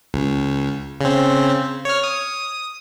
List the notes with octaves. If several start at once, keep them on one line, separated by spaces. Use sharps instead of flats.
C#2
C#3 C4
C#5 F6
D#6